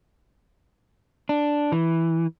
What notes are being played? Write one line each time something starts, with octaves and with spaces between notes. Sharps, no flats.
D4
E3